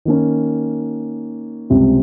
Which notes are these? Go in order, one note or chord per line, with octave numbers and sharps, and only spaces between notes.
D#3 A#3 C#4
C#2 C3 G3 C4